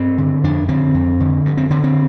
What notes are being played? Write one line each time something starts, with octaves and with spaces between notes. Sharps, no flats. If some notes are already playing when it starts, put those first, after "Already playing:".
Already playing: G2 C4
D3
F2 D4
D3 C4
F2
D3
G2
C4
D3 C4
C4